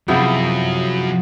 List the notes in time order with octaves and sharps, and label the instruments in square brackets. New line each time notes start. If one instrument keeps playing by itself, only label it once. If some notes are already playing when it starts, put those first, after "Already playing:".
[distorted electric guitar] F#2 [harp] C3 F3 E4 [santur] G#3 B3 B5